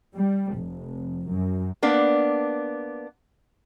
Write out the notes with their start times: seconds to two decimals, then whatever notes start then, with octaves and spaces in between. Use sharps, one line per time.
0.16 G3
0.57 F1
1.30 F#2
1.82 A#3 B3 D4